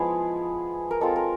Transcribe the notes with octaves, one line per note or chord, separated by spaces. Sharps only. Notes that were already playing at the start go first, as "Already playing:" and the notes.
Already playing: F3 G#3 B3 E4 G#4
A#4
G#3 C4 F4 A4
A#4